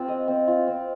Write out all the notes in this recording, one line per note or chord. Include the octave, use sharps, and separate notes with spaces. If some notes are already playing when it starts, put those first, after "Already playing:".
Already playing: C4 F4
D#5
C4
F4
C4